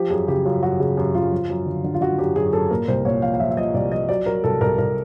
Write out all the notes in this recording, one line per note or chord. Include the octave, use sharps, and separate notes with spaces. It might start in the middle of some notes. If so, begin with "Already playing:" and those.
Already playing: F3 G4
F#2 G#4
C#3 G4
F#2 F4
F#2 F#4
C#3 G#4
F#2 G4
C#3 F4
F3
F#2
D3
D3
F4
D3 F#4
F#2 G4
F#2 G#4
F#2 A4
A#2 A#4
C2 C5
A#2 C#5
F3 F5
F5
F3 E5
E5
F3 D#5
C2 D5
F3 D#5
F#3 D5
F#3 A#4
C2 A4
C2 A#4
C2 A#4